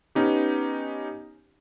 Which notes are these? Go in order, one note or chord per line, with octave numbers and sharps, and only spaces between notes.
B3 C#4 D#4 G4